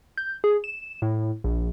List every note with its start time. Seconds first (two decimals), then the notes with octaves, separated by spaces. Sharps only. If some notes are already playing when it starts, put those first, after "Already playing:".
0.17 G6
0.44 G#4
0.64 E7
1.02 A2
1.44 A#1